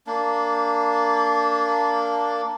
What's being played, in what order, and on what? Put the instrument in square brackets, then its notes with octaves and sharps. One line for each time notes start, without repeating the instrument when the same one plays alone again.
[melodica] A#3 D4